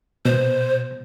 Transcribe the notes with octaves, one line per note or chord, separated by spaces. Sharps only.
B2 C5